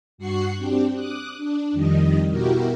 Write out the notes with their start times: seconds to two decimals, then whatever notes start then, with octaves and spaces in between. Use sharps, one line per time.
0.18 G2 F#4 F#5 C#6 F#6 C7
0.57 C4 D4 G4
0.93 D6 D#6 F#6
1.37 D4
1.72 F2 D#3 G3 D#5
2.30 B2 E4 F#4 G4 A#4